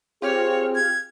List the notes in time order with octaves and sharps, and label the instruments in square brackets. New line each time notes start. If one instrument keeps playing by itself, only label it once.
[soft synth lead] C4 [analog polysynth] F4 G4 F6 [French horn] G#4 [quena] C#5
[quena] G#6